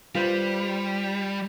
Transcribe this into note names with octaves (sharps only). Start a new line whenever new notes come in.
G3 F4 B4 C5